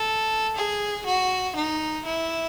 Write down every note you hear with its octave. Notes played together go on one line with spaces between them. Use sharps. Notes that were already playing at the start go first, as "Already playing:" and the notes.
Already playing: A4
G#4
F#4
D#4
E4